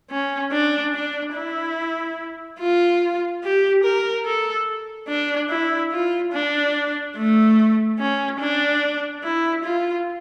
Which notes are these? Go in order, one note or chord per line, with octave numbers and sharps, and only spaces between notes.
C#4
D4
D4
E4
F4
G4
A#4
A4
D4
E4
F4
D4
A3
C#4
D4
E4
F4